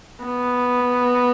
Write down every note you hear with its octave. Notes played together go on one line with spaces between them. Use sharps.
B3